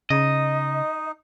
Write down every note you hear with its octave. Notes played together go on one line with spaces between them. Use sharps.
C#3 D#4 D#5